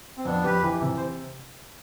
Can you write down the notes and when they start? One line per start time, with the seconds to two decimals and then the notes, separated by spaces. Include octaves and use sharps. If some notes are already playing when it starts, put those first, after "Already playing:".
0.17 C4
0.25 F2 B3 D4
0.44 F2 G4 B4
0.63 E3
0.82 C3
0.97 C5